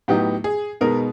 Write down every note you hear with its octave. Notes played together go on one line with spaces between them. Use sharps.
A2 F#3 B3 D#4 G4
G#4
B2 G#3 B3 D#4 A#4